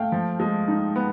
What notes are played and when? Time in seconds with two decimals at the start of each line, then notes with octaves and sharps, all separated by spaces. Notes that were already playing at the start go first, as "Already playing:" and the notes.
Already playing: A3 F5 G5
0.12 F3
0.40 G#3
0.68 D#4
0.96 B3